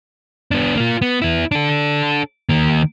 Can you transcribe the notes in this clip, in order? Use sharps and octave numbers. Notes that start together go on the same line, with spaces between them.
B3 D4
A#3 F4
B3
B3 E4
D4 A4
D#3 A#3